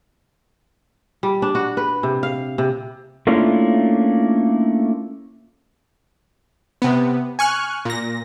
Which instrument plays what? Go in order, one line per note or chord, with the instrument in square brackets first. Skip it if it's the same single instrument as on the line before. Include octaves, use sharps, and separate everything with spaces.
[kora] G3
D4
F#4
B4
C3
F5
C3
[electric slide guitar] A3 A#3 C#4 D4 E4 F4
[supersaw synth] C3 B3
G#5 C#6 F6 F#6
A#2 A#6